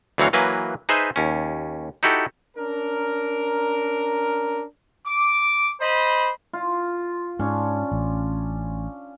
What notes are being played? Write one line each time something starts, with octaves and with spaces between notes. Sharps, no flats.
D2 E3 F#3 C4 C#5 F5
E3 F#3 A#3 B4 G#5
D#4 G#4 B4 C5 D#5 E5
D#2 C#4
D#4 E4 F#4 G4 A4
C#4 D4 A#4
D6
C5 D#5 B5
F4
G#2 C#4 D4
A1